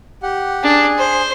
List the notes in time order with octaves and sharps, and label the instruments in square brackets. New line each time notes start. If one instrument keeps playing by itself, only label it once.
[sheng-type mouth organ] G4 F#5
[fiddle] D4 [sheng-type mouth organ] G#4
[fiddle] C5